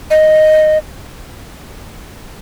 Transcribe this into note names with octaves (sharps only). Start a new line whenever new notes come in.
D#5